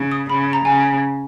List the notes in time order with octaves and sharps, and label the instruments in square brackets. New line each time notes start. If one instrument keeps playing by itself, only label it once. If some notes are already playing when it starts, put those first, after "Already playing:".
Already playing: [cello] C#3
[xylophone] D#6
[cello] C#3 [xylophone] B5
[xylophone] A#5
[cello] C#3 [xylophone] G#5